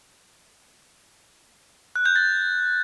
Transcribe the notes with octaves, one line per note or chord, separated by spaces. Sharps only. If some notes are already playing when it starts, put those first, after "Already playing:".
F#6
G6
A6